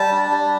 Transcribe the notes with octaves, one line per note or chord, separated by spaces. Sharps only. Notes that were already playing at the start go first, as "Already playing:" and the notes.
Already playing: G3 A5
D4
G3